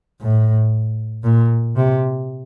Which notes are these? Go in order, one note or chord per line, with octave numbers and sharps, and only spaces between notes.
A2
A#2
C3